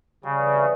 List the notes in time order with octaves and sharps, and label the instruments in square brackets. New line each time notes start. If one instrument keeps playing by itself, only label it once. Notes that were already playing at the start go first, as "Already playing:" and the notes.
[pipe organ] C#3 [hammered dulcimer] G3
[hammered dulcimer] E3
C3